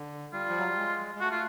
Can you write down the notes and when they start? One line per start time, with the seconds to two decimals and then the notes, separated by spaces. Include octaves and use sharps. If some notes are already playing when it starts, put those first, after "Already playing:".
Already playing: D3
0.33 G3 F4
0.49 F3
0.58 F#3
0.68 G3
0.77 G#3
1.15 G#3
1.21 A3 F#4
1.31 F4